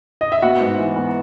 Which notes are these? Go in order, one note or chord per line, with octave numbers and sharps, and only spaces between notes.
D#5
E5
B3 F#4 F#5
G#2
E3
B3